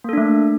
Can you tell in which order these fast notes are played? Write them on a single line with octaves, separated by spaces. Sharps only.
A#3 A4 D4 A3